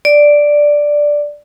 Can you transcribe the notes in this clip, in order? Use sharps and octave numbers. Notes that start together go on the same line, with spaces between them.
D5